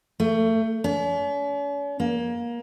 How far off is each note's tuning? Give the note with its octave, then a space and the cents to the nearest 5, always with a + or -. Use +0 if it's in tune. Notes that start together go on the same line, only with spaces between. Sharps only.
A3 +30
C#4 +45
A#3 +25